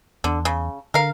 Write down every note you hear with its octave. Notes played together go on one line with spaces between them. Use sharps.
E2 D3
C#3
D3 A#4 F5